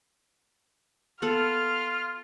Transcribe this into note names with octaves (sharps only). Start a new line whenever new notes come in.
B3 F4 A4 F6